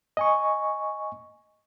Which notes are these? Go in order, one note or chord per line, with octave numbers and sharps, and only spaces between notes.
D#5 G#5 C#6